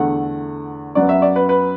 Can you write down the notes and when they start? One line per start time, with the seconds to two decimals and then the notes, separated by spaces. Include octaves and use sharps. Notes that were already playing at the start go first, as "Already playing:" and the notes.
Already playing: E2 D3 A3 F#5
0.95 F#2 F#3 B3 D5
1.09 E5
1.22 D5
1.36 B4
1.49 B4